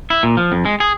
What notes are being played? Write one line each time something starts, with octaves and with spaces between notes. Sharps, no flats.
E4
A#2
F3
F2
G#3
G#4